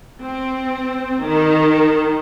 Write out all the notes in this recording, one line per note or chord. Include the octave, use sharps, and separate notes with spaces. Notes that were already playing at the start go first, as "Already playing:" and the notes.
C4
D#3